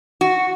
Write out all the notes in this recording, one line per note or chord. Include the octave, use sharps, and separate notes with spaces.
F#4